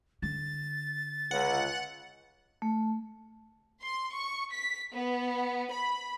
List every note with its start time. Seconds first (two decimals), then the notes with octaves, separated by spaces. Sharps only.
0.22 D3 A6
1.31 C#2 F#5
2.62 A3
3.82 C6
4.13 C#6
4.52 B6
4.93 B3
5.72 B5